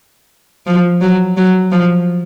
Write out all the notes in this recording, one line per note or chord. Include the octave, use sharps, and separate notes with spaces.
F3
F#3
F#3
F3